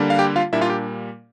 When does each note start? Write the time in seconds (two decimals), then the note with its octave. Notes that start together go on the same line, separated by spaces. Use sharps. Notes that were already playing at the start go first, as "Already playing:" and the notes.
Already playing: D3 G3 A#3 D4
0.10 F5
0.19 G4 G5
0.36 F4 F5
0.53 A#2 G3 A#3 D4 E4 E5
0.61 F4 F5
0.70 G4